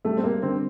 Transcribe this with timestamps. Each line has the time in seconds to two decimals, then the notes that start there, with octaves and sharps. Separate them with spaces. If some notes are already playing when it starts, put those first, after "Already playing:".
0.05 G3 A3
0.17 C4
0.23 A#3
0.42 D3 C4